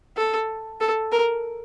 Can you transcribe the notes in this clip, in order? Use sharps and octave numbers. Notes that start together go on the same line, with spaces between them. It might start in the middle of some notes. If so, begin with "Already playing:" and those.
A4
A4
A#4